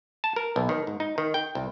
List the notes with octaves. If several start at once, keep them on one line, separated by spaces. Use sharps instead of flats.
A5
A#4
B1
D#3
G#2
D#4
D#3
G5
C2